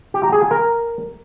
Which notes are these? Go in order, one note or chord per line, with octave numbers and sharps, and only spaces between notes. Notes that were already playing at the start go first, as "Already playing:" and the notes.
G4
A#5
G#4
G#5
A#4